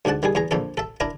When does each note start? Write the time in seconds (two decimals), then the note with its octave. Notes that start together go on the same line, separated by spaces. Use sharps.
0.05 D2 G#2 D4 F#5 A5
0.23 D#3 G3 G#4
0.35 E2 G#4 A#5
0.51 A#1 F2 D4 A4
0.77 A4 E5
1.00 D4 E4 A#4 A#5